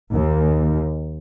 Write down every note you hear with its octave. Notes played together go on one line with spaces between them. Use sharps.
D#2